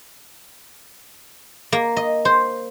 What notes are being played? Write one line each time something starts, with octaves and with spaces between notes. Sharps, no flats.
A#3
D#5
C5